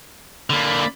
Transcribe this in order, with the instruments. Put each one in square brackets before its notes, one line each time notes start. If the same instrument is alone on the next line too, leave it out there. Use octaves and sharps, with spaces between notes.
[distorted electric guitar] D3 A#3 [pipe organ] D5 B5